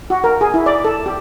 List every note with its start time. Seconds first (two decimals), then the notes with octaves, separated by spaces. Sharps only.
0.10 F#4
0.24 A#4
0.41 G#4
0.54 E4
0.66 D5
0.85 A4
1.06 G4